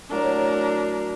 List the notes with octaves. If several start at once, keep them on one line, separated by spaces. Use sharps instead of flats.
A2 F#3 D4 A#4 A#5